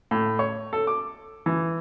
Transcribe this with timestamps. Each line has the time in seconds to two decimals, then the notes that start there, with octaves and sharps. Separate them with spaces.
0.11 A2
0.39 C#5
0.73 A4
0.87 D6
1.46 E3